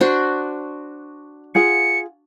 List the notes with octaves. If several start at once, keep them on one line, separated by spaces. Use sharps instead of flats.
D4 F#4 C5
F4 G#4 F#5 C#7